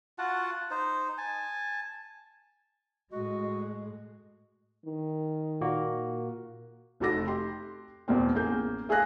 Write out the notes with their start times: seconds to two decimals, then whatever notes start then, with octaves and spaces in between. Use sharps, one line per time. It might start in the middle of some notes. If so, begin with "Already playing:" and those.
0.18 F4 F#4 F#5 A5
0.71 D#4 C5
1.18 G#5 A5
3.12 A2 G#3 F#4 D#5
4.86 D#3
5.61 A#2 A#3 F#4
7.00 F1 D#4 F#4 A4 D6 A#6
7.27 G4 C6
8.08 E2 B2 A#3 C4
8.35 A1 A#3 G#4 G6
8.89 A3 G#4 F5 G#5 F#6 A#6